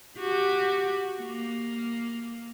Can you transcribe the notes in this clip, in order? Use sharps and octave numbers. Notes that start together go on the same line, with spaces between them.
F#4 G4
A#3